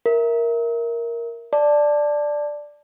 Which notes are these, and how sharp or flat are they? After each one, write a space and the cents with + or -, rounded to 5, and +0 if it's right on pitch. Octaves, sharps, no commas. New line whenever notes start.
A#4 +0 E5 +0
D5 +0 A5 +0